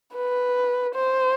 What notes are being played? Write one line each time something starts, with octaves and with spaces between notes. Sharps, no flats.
B4
C5